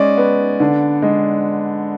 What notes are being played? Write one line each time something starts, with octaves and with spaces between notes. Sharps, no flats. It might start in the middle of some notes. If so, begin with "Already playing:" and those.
Already playing: G#3 C#4 D5
B3
D3
G#3